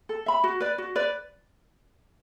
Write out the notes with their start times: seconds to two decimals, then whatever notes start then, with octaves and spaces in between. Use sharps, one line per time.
0.09 A4
0.26 E5 B5
0.44 F#4
0.60 B4 D5
0.78 F#4
0.96 B4 D5